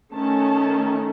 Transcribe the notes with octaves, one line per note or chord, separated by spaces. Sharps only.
D#3 A3 C#4 A5